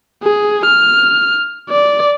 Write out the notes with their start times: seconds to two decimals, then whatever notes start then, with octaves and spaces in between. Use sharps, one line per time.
0.23 G#4
0.65 F6
1.69 D5